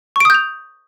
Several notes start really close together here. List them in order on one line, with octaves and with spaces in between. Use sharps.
C#6 D7 D#6 G6 F7